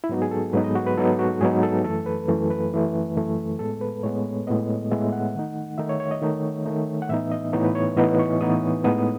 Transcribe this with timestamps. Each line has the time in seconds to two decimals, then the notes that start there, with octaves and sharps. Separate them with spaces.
0.04 E4
0.09 G#2 F#3 B3 D#4 F#4
0.22 G#4
0.31 A4
0.53 G#2 F#3 B3 D#4 B4
0.64 D#5
0.75 F#4
0.86 B4
0.97 G#2 F#3 B3 D#4 A4
1.19 F#4
1.41 G#2 F#3 B3 D#4 G#4
1.63 A4
1.84 F#2 E3 A3 A4
2.06 B4
2.28 F#2 E3 A3
2.50 B4
2.72 F#2 E3 A3
3.16 F#2 E3 A3
3.59 A2 G#3 B3 A4
3.81 B4
4.03 A2 G#3 B3 C#5
4.47 A2 G#3 B3 D#5
4.91 A2 G#3 B3 E5
5.12 F#5
5.35 D#3 A3 D#4
5.78 D#3 A3 D#4 E5
5.89 C#5
6.00 C#5
6.11 D#5
6.21 D#3 A3 D#4
6.66 D#3 A3 D#4
7.02 F#5
7.09 A2 E3 B3 D#4 E5
7.31 D#5
7.53 A2 E3 B3 D#4 C#5
7.64 B4
7.75 C#5
7.97 A2 E3 B3 D#4 D#5
8.19 C#6
8.41 A2 E3 B3 D#4 D#6
8.84 A2 G#3 B3 D#4 D#6